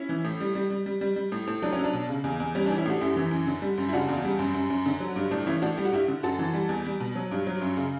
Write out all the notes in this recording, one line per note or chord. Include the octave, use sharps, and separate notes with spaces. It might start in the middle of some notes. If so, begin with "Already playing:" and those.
Already playing: C#4 E4
E3
A2
G3
G3
G3
G3
G3
G3
A2
A2
F#3 D4
C#4
F#3
D4
B2
C#3
E2
E2
G3 C#4
D4
E3
C#4 E4
A2 D4 F#4 G4
F#2 E4 G4
E3
F#2
D3
G3
F#2
E4
C#3 D4 F#4
E2
G3
F#2
F#2
F#2
D3
F#3
G2
A2 D4
E3 C#4 E4
A2 D4 F#4
G3 G4
F#4
G2 E4 G4
D3
F#2 F#4 A4
E3
G3
E2
G3
B2
F#3
G2
F#3
F#2
C#3